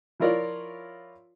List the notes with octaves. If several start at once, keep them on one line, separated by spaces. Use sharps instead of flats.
F3 E4 F4 A#4 C#5 D5